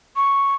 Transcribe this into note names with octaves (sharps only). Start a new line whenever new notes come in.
C#6